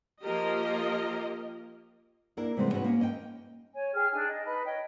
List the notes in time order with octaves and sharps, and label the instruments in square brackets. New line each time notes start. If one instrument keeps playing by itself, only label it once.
[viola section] F3 A#3 F4 G4 A#4 D#5
[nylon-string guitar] A#3 D4 E4 A#4
C3 E3 G3 G#3 B3 C4
C#4 D#4 F#4 B4
A#3 C#4
A#4 D#5 E5 G5
[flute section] C#5 G#5
G#4 G5 F6
D4 D#4 G#4 G#5
D#5
D#4 B4 A5
C#5 D#5 G5